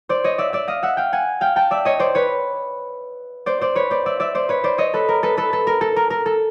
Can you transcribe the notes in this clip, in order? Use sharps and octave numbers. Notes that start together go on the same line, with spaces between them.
C5 D5
C#5 D#5
D5 E5
D5 E5
D#5 F5
E5 F#5
F5 G5
F#5 G#5
F5 G5
G5 A5
D5 E5
C#5 D#5
C5 D5
B4 C#5
C5 D5
C5 D5
B4 C#5
C5 D5
D5 E5
D5 E5
C5 D5
B4 C#5
C5 D5
C#5 D#5
A4 B4
A#4
A4 B4
A4 B4
A4
A#4
A4
A#4
A#4
A4